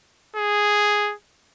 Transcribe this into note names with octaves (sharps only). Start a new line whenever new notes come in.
G#4